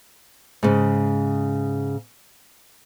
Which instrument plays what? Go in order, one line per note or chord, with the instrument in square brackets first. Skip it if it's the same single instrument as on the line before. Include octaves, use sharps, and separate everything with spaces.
[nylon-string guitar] G#2 C#3